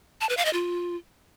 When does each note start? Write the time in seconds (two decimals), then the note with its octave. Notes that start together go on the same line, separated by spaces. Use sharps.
0.21 A5
0.29 B4
0.37 F5
0.45 D#5
0.53 F4